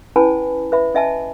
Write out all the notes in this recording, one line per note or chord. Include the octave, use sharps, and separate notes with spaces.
C#4 E4 B4 G#5 A5 B5
B4 E5 B5
C#4 D#5 E5 G#5 A5